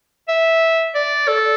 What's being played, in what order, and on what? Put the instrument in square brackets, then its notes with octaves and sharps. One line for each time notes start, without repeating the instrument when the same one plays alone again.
[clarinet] E5
D5
A4